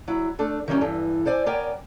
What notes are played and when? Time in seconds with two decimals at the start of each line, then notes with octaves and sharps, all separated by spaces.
0.08 F#3 E4
0.39 A3 D4 A4
0.68 D#3 E3 F#3 G3 C4 C#4
0.81 E2 G2 E3 A4
1.25 A4 C5 D5 G#5
1.46 B3 A#4 C#5 D5 G5 G#5